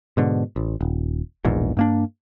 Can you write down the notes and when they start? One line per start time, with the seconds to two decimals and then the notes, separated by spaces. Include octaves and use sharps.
0.17 G#2 B2 D3
0.56 A1
0.81 D#1
1.45 E1 A#1 E2 G#2
1.77 G2 A#3 D4